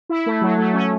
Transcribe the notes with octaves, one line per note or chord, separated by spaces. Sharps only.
E4
A3
F#3
A3
C#4